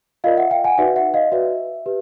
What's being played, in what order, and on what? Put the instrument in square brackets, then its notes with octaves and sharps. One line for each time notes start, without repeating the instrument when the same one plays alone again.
[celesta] F4 A#4 D5 D#5 F5
E5 F#5
F5 G5
F#5 G#5
D#4 F#4 B4 D5 E5 F#5
E5 F#5
D#5 F5
F#4 B4 D5 E5
G4 B4